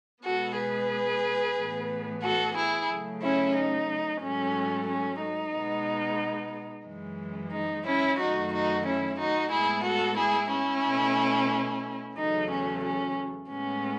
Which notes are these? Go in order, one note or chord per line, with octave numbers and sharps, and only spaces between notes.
B2 G#3 B3 F#4 A4
G#4 B4
A2 E3 B3
F#4 A4
E4 G#4
C#3 F#3 A3
C#4 E4
D#4
G#2 F#3 A3 C#4
C#4
D#4
B2 G#3 B3
F#2 E3 G#3
D#4
C#4 E4
F#2 D#3 A3 D#4 F#4
D#4 F#4
C#4 E4
D#4 F#4
A2 G#3 B3 E4 G#4
F#4 A4
E4 G#4
C#4 E4
B2 A3
E2 C#3 F#3 A3 D#4
C#4
C#4
A2 G#3 B3 C#4